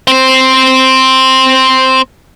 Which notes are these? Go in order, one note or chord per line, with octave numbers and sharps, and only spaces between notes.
C4 C5